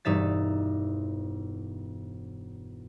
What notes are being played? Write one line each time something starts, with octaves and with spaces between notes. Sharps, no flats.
E1 G2 D#4 E5 A6